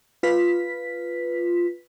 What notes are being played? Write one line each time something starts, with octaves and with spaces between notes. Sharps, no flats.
F4 B4 B6